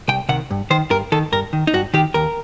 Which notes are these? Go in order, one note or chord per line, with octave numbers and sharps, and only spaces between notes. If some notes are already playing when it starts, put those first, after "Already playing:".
C2 G5
C3 D#3 F#5
G2
D#3 C5
G2 A#4
D#3 A4
G2 A#4
D#3
D#4
G2 F#4
D#3 G4
D#2 A#4